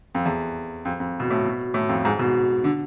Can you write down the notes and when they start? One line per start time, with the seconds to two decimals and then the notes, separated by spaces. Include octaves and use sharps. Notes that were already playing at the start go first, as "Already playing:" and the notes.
0.15 F2
0.25 E2
0.85 F2
1.00 F2
1.20 B2
1.30 A2
1.45 B2
1.74 A2
1.89 F2
2.05 G#2
2.19 B2
2.64 D3